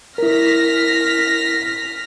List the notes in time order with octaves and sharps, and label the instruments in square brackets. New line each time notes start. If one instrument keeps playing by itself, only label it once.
[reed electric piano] E4 A#4 [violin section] F6 A#6 B6